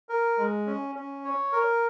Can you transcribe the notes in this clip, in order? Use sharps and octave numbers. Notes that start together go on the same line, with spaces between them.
A#4
G#3
C#4
C#4
C#5
A#4